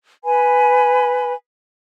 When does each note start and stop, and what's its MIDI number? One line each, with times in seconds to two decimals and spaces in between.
0.24 1.33 71
0.24 1.33 80
0.24 1.33 83